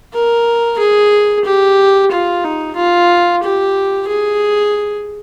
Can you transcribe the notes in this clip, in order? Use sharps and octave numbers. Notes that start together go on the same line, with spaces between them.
A#4
G#4
G4
F4
D#4
F4
G4
G#4